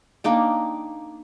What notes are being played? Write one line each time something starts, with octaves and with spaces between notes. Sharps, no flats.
A#3 D4 D#4 G5